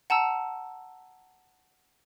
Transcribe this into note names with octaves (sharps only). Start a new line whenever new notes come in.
F#5 A5 A#5 E6